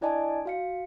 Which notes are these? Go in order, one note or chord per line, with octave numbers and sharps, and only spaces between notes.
D4 E4 D5 D#5 G#5 A5
F#4 F5 C#7